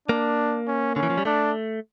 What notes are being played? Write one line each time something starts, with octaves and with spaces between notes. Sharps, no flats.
A#3 D4
C#4
D3 C#4
E3
F3
G3
A3 D4